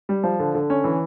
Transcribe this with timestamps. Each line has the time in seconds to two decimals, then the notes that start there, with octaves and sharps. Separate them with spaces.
0.09 G3
0.24 F3
0.39 D3
0.55 D3
0.70 C#4
0.84 E3